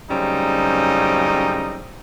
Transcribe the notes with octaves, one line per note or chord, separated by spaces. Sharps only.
F#2 A2 C#3 G3 C4 D#4